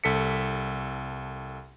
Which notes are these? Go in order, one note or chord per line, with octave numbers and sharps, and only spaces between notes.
C2 A4 B6 C#7